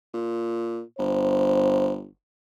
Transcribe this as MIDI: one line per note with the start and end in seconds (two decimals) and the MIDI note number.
0.14 0.81 46
0.99 2.07 31
0.99 1.94 72